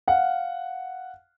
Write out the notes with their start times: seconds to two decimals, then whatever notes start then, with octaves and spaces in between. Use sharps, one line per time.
0.08 F5 F#5